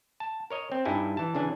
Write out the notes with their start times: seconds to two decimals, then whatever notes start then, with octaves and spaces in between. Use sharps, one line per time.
0.20 A5
0.50 A#4 C#5 D#5
0.72 C4
0.85 G2 G3 D#4 E4 G#5
1.17 E3 A5
1.35 C#3 E3 D4 G#5